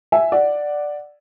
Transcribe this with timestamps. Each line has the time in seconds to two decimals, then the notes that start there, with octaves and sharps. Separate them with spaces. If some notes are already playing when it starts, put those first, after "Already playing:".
0.12 E5 G#5
0.32 D5 F#5